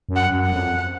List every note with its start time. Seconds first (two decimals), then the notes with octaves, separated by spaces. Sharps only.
0.09 F#2
0.16 F#5
0.31 F#2
0.46 F#5
0.53 F2